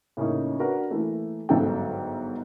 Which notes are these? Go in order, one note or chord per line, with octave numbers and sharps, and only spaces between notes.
A2 C#3 A#3 C#4 D#4
D4 F#4 A#4 B4 F#5
E3 A3 A#3
G1 G#2 F#3 A4 F5 G5